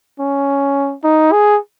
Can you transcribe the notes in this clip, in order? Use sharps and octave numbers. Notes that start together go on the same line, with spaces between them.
C#4
D#4
G#4